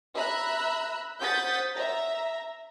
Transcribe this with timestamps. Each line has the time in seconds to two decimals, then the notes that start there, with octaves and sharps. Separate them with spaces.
0.15 E5 A#5 B5 E6 F#6
1.21 C5 F#5 D#6 G6 A6 B6
1.75 E5 A#5